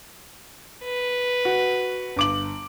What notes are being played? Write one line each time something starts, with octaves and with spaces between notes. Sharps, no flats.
B4
F#4
G1 D6 F#7